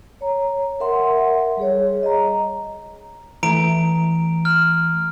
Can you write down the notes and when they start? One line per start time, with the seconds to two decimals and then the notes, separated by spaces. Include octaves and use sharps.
0.21 C#5 A#5
0.80 A#4 E5 F#5 C6
1.57 G3 G#4 C#5
2.03 D#5 A#5
3.43 E3 A3 A#5 D7
4.45 F6